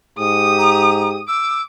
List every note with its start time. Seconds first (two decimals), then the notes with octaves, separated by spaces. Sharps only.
0.19 G#2 G4 D#6
0.58 A#5
1.28 D6 E6